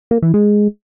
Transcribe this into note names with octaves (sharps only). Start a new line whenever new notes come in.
A#3
E3
G#3